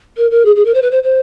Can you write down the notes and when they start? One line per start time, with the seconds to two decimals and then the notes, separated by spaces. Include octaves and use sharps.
0.17 A#4
0.31 A#4
0.45 G#4
0.56 G#4
0.65 A#4
0.74 C5
0.82 B4
0.91 C5
1.03 C5